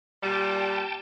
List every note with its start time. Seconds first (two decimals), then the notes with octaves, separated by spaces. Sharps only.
0.23 A#2 G3 G5 A5